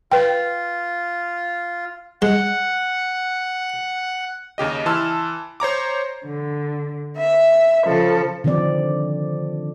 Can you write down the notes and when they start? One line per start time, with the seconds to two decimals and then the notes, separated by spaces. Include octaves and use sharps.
0.12 F4 B4 G5
2.22 G#3 F#5
4.58 D#2 C#3 G4 D#5
4.86 E3 A5 C6 E6 F6
5.60 C5 C#5 A#5 D6
6.26 D3
7.16 E5
7.85 C#3 F3 A4
8.44 D3 D#3 F3 C4 D5